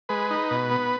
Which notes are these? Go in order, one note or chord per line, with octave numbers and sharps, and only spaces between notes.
G#3 B4
D#4
B2
B3